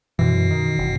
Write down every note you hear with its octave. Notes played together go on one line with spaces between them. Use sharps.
F#2 B2 E3
D#3
F#1